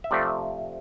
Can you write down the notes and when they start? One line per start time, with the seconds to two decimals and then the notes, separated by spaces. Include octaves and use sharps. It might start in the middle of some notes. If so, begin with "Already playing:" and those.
0.04 E5
0.11 C3 F3 A3 C4 D5